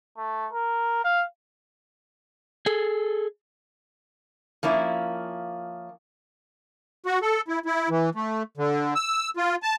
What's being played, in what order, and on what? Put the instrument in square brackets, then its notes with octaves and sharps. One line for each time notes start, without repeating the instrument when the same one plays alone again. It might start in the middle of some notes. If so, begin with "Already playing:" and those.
[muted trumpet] A3
A#4
F5
[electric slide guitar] G#4 A4
[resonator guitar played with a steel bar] F3 A#3 C#4 E4
[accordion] F#4
A4
E4
E4
E3
A3
D3
E6
F4
A5